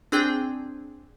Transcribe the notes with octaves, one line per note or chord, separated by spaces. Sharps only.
C4 D4 G#4 G5